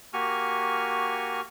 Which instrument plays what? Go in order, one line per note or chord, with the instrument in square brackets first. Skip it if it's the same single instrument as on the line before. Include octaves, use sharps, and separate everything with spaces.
[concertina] A#3 F#4 G4 G#5 C#6 F6